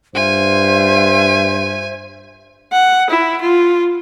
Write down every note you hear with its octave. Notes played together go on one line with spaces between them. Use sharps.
G2 F4 C5 E5 G#5
F#5
E4
F4